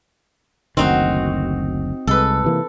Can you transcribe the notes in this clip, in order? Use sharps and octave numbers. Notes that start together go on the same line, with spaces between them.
F#1 D2 D#3 C4 D#4 F#4
C2 G#3 A4 B4
C3 E3 A#3